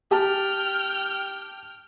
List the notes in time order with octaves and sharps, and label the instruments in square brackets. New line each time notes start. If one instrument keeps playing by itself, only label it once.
[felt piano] G4 A5 [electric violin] G5 F6